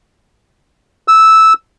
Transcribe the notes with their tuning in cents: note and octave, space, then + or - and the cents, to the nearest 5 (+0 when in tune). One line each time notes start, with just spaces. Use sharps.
E6 -10